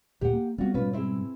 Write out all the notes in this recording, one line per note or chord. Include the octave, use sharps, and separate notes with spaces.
D2 A#2 G4 F#5
A#3
G3 B3 C4 F4 F#4
G#2 B2 G3 C#4 F4 B4
C4 E4 G#4